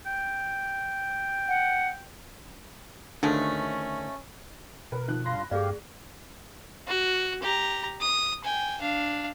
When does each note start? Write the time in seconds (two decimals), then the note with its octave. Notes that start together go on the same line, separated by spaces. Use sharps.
0.06 G5
1.48 F#5
3.23 D2 D#3 F3 G#3 A3 C#4 D4
4.92 B2 A#4 B4
5.08 D#3 F3 F#6
5.26 G2 F4 B5 C6 A#6
5.51 G2 A3 G4 G#4 D5 F5
6.87 F#4
7.42 G4 A#5
8.01 D#6
8.44 G5 G#5
8.81 D4 F5